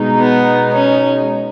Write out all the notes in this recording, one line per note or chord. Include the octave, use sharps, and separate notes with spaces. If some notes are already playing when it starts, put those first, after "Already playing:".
Already playing: B2 G#3 D#4
B3
C#4